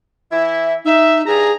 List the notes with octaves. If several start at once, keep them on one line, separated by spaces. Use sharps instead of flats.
E3 E4 E5
D#4 E5
G2 G#4 A#5